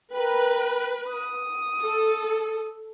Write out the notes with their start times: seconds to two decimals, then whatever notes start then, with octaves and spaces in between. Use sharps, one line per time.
0.14 A#4 B4 G5
1.09 D#6
1.83 A4